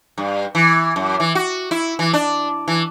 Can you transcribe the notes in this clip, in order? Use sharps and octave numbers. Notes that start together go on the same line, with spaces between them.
G2
E3
F#2
E3
F#4
E4
E3
D4
E3